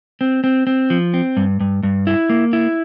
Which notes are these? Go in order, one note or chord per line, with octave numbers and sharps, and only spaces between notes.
C4
C4
C4
F3
C4
G2
G2
G2
E4
A#3
E4